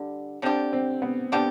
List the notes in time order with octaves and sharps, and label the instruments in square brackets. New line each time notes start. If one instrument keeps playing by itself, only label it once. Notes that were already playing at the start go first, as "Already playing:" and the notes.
Already playing: [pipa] D3 G3
[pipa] D3 G3 D4 G4 [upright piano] C4
[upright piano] C4
B3
[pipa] D3 G3 D4 G4 [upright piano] B3